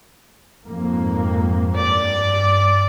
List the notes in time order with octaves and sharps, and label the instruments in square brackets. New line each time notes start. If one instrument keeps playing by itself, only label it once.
[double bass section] F2 G#2 A#3
[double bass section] G2 [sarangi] D5